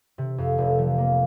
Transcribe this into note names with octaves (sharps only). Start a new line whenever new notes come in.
C3
F2
F1
F3
A#3